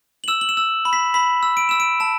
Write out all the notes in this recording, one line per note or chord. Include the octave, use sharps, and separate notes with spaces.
F#7
E6 E7
F#7
E7
E6
B5
B6
B5 B6
E6
D7
E6 E7
D7
A5 E7